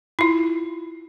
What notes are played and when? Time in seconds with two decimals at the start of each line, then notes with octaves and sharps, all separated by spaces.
0.19 E4 F4